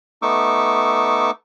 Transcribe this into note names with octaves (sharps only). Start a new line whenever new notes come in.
A3 B3 D#4 C#6 D6 E6